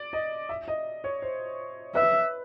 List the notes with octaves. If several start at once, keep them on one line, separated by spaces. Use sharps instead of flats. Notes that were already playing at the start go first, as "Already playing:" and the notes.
Already playing: D5
D#5
E5
D#5
C#5
C5
B4 E5